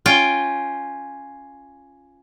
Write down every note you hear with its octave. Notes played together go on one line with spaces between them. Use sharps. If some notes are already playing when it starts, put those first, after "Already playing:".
C#4 F4 G5